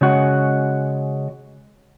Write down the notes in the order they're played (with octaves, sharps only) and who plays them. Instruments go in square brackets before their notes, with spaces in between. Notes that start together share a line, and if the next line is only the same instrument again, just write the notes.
[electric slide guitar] C#3 G#3 F#4